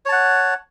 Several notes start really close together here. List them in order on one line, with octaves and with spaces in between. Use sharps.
C#5 A5 F#5